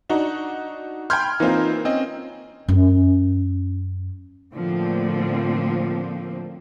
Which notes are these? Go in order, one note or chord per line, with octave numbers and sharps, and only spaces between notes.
D4 D#4 F#4
G5 B5 C6 F6 G6 G#6
E3 A#3 C4 D#4 F4
C4 C#4 D#5
F#2 C#4
A2 D3 F3 A#3 C4